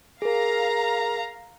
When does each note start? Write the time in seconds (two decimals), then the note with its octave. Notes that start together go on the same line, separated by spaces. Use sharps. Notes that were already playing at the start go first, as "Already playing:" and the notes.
0.22 G#4 A#4 F5 A#5